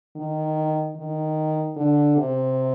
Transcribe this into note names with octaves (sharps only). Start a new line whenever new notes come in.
D#3
D#3
D3
C3